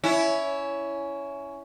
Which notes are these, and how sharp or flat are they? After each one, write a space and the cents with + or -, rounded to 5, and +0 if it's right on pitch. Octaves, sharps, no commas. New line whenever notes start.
C#4 +15 E4 +0